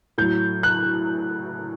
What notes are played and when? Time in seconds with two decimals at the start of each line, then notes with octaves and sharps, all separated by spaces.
0.18 A2 F#3 G6
0.63 F#6